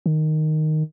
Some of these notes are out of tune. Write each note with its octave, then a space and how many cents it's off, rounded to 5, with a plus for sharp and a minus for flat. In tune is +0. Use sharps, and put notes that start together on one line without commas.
D#3 -5